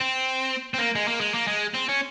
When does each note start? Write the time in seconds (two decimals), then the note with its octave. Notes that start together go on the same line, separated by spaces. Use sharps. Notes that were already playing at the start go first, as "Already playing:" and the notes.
0.01 C4
0.74 C4
0.79 A#3
0.95 G#3
1.08 A#3
1.21 G#3
1.34 A#3
1.47 G#3
1.74 C4
1.89 C#4